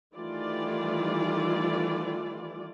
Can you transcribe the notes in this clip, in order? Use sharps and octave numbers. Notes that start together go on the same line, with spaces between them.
D#3 E3 G3 A3 F4 D5